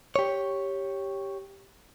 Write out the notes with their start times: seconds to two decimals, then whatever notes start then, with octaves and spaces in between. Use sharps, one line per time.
0.16 G4 C#5